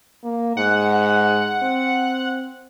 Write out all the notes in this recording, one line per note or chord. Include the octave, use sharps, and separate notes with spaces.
A#3
G#2 F#5
C4